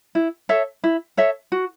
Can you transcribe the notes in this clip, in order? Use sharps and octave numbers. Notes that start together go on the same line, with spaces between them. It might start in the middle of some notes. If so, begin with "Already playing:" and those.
E4
A4 C#5 E5
E4
A4 C#5 E5
F#4